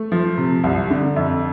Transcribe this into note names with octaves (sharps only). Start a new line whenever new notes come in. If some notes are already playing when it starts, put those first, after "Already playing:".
Already playing: A3
F3
C3
C2
D3
F2